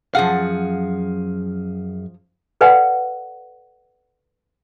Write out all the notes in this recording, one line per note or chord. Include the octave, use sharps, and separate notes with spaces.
F#2 F3 G#4 F5 F#5
A4 B4 D5 F5 F#5 G#5